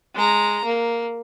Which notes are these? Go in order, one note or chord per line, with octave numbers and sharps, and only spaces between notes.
G#3 A#5
A#3